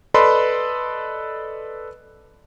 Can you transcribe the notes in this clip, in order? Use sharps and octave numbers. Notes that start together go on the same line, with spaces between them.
A4 B4 D5 D#5 B5 C6